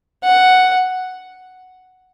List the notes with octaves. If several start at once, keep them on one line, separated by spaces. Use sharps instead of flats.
F#5